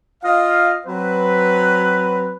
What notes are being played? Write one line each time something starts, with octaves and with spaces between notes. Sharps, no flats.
F4 D#5 F5
F#3 C4 B4